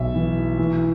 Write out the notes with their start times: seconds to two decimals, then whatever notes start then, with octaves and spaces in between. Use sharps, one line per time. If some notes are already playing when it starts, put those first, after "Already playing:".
Already playing: B1 E5
0.15 E3
0.58 E3